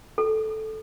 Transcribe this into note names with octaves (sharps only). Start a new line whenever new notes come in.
A4